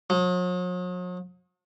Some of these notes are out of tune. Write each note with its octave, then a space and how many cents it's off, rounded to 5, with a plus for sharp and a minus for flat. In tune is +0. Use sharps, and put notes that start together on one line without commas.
F#3 -45